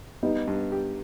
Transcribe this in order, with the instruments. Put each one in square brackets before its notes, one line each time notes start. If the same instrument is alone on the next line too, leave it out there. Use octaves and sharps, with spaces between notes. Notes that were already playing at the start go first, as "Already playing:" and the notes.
[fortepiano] G3 [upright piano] B3 D#4
[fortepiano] G2
G4